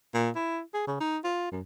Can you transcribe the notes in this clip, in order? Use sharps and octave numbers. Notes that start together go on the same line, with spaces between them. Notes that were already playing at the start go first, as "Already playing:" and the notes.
A#2
E4
G#4
C#3
D#4
F4
F#2